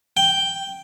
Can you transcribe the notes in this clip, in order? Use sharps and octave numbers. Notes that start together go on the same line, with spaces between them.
G5